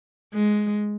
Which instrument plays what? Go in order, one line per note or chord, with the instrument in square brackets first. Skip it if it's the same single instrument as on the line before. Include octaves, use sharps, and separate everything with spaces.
[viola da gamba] G#3